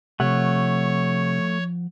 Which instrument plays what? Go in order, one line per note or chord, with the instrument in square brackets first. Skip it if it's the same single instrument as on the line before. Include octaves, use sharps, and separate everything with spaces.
[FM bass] C3 [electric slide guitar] F3 F#5 [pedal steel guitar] A3 [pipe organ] C#5